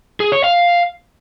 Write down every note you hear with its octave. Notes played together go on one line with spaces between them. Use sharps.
G#4
C#5
F5